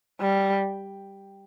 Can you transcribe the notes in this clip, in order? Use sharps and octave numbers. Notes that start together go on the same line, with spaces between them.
G3